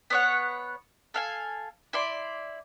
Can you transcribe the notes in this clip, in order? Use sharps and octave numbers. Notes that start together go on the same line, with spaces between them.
B3 C#5 F#5
A4 F5 G#5
E4 D5 C6